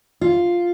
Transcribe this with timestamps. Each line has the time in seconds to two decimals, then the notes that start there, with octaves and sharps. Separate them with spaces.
0.21 F4